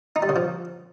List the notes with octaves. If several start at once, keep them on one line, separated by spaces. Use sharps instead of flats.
D#4
G3
C#3
F3